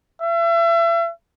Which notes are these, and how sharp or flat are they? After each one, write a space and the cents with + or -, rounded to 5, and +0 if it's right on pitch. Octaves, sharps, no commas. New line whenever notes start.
E5 +35